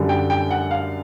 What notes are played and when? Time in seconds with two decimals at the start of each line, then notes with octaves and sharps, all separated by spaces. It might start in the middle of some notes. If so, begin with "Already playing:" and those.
Already playing: F#2 D3 G3
0.09 G5
0.30 G5
0.51 F#5
0.71 F5